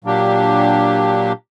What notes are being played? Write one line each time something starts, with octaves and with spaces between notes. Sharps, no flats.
A#2 F#3 A#3 D4 G4